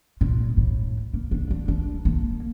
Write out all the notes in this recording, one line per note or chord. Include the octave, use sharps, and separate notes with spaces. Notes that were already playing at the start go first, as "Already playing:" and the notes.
A#2
A2
A#3
D4
D4
D4
A#3